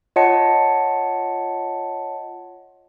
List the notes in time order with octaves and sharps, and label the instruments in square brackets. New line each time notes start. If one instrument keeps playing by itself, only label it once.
[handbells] F4 C#5 D#5 F#5 A5 C#7